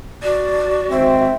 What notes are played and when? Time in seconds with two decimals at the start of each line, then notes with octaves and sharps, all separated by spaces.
0.23 F#4 D5
0.91 D#3 G#3 C4 E5